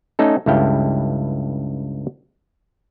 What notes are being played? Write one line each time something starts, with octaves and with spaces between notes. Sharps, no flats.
A3 C#4 D#4 A4
C#2 G2 E4 A4 F5 G5